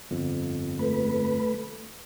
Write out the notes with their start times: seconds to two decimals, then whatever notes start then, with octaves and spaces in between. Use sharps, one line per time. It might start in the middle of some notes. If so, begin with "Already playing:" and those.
0.11 G1 F2
0.79 A3 B4